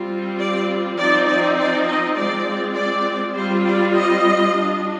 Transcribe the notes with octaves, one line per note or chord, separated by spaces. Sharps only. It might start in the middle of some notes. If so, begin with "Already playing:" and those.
Already playing: G3 C4 F4
D5
F3 C4 D#4 D5
D5
D5
D#5
G#3 C4 F4 D5
D5
G3 C4 F4 C5
D5
D#5
G3 D4 F4